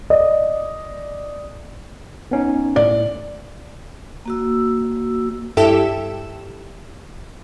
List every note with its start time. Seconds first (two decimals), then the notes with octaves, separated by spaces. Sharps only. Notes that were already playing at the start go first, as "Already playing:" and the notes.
0.10 D5 D#5
2.31 B3 C#4 D#4
2.76 A2 D5
4.26 A#3 F#4 E6
5.57 G2 E4 G4 A4 E5 E7